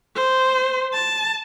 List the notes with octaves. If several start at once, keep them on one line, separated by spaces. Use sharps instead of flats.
C5
A5